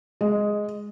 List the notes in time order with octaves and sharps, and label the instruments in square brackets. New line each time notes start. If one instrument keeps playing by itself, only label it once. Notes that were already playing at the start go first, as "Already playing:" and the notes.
[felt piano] G#3